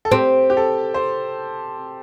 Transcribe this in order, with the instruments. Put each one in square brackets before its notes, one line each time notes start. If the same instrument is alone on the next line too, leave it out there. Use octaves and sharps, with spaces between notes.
[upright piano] A4
[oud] C4 [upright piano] G4
[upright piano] G4
A4
C5